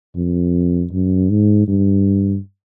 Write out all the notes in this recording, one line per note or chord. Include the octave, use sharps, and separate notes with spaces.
F2
F#2
G#2
G2